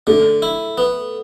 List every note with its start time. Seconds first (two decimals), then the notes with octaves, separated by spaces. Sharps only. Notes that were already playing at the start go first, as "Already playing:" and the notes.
0.07 D3 A3
0.42 E4
0.78 B3